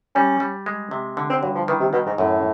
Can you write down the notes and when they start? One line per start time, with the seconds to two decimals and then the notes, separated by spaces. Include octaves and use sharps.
0.15 G3 C#4
0.40 G3
0.66 G#3
0.91 C3
1.17 D3
1.30 C4
1.42 G2 F#3
1.55 F3
1.68 D#3 E3
1.80 C3
1.93 B2 D#3
2.06 G#2
2.18 F#2 A2